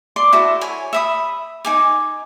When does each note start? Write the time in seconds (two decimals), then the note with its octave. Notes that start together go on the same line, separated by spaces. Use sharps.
0.16 D5 C6 D6
0.33 E4 F#4 A4
0.61 C#5 G#5
0.93 E5 B5 D#6
1.65 D#4 G#5 D6